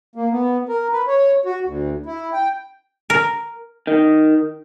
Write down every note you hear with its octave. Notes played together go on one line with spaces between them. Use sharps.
A#3
B3
A#4
B4
C#5
F#4
D2
E4
G5
A#4
D#3